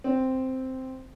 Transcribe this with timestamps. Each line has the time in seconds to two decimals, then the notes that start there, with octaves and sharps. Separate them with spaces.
0.04 C4